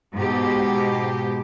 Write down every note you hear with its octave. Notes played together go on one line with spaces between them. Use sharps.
G#2 B2 G4